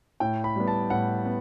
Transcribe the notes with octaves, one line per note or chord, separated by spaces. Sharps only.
A2 G5
B5
G3 B3
A5
A2 F#5
B3